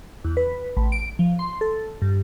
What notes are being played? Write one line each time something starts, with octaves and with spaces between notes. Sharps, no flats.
E2
B4
A1
D7
F3
C6
A4
G2